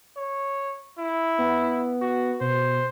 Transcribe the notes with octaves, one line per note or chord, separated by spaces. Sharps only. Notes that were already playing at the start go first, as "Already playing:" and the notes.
C#5
E4
B3
F#4
B2 C5